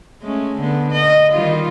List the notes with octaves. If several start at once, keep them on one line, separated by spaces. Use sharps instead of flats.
G#3 A3 C#4
D3 B3
D#5
D#3 G3 F4